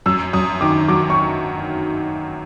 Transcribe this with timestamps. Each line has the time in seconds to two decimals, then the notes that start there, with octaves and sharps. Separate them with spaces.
0.06 F#2 E6
0.33 F#2 D#6
0.61 D#3 D6
0.88 F#3 D6
1.10 C#6